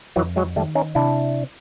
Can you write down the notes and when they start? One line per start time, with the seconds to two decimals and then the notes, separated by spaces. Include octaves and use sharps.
0.16 F2 E3 F#3
0.36 F#3 G#3
0.56 D#3 G3 A3
0.75 C#4 D#4
0.95 C3 D4 E4